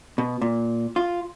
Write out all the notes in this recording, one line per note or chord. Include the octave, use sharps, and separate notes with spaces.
B2
A#2
F4